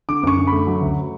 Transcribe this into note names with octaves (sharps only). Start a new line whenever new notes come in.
D3 D6
F#2 C#6
D3
A3 B5
F#3
D2